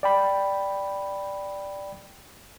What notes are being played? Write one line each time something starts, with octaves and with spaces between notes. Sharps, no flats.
D5 G5 B5